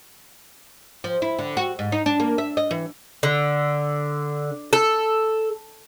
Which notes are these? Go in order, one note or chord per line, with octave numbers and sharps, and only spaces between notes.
F3
E4
D3
F#4
G#2
D#4
D4
A#3
E5
D#5
E3
D3
A4